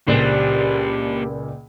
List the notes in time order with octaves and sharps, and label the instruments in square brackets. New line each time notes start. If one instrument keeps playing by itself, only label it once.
[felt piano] C#2 A#2 D5 [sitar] G3 D4 [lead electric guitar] A#3 C5